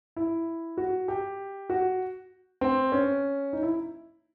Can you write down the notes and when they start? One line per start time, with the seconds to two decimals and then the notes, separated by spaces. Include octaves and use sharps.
0.16 E4
0.78 F#4
1.08 G4
1.70 F#4
2.61 C4
2.92 C#4
3.53 D#4
3.63 E4